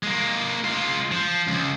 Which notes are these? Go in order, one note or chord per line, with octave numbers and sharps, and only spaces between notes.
G#3 A#3
G#3 F4
F3
C#2